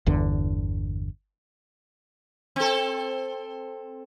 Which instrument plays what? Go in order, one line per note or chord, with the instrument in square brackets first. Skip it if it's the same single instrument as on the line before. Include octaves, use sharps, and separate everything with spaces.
[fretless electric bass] G1 E2 D3
[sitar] C4 A4